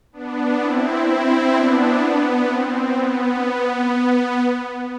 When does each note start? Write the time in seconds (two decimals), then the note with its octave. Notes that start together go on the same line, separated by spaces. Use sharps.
0.13 B3 D4
0.59 C4 E4
1.06 C4 E4
1.52 B3 D4
2.00 B3
2.46 C4
2.93 B3